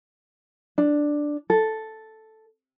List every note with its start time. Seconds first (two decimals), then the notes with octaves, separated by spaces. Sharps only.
0.78 D4
1.50 A4